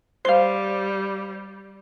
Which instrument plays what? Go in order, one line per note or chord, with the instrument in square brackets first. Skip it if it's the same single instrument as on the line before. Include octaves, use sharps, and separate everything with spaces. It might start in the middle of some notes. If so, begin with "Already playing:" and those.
[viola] G3 [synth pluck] C5 F5